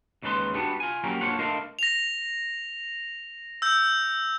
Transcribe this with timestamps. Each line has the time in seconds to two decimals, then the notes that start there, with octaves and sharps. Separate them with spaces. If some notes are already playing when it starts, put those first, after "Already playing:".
0.23 D#2 C#3 G#3 A4 B4 C6
0.54 G3 B3 D4 F#4
0.80 F4 G#5
1.04 F#3 A#3 C#4 G4 A#4
1.21 A#3 D4 F4 C5 C#5 F#5
1.39 A3 D4 A#4 C5 D#5 F5
1.79 A#6 F7
3.62 E6 G6